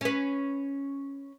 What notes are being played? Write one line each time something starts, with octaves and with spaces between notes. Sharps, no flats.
C#4 B4